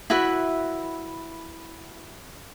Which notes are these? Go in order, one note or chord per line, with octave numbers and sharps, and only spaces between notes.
E4 F#4 B4 E5